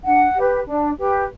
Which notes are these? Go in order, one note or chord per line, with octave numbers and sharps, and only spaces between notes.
D4 F#5
G4 B4
D4
G4 B4